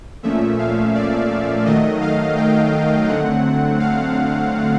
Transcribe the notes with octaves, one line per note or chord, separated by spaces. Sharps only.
A#2 F3 A3 C#4 E5
F5
D5
D#3 F#3 A3 D#5
F5
G5
D3 F#3 A3 C4 F#5
F5